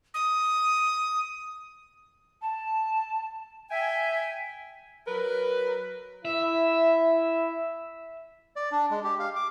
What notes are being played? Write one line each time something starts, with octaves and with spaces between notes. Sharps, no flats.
D#6
A5
E5 G5 G#5
F#3 A#4 B4
E4 E5
D5
D4
G#3
G4
F5
D6